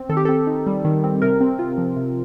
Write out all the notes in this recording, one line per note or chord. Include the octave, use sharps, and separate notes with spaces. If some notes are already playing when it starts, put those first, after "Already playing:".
Already playing: C4
D#3 A4
G4
C4 A4
D#4
G3
D#3
C4
C3 A#4
C4
F4
F3
C3